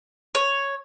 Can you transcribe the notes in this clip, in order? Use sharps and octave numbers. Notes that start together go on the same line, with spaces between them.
C#5